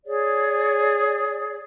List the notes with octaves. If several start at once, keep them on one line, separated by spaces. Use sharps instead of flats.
G#4 C#5 D5